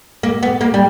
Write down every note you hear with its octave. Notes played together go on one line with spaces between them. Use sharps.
A#3
B3
A#3
G3